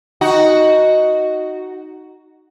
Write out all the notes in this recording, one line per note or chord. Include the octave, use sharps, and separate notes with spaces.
D#4 F#4